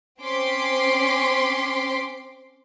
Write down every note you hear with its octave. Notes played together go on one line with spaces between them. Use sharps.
C4 C#4 C6 D6 B6